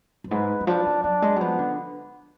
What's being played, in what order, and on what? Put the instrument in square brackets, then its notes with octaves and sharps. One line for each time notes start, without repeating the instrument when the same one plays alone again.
[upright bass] F#2
[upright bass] G#2 [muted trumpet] B4
[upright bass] D3
[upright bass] F3 [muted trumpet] D4
[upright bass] F#3
[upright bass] F#3 [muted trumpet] D4
[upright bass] G#3
F#3
[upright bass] F3 [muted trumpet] B3
[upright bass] D3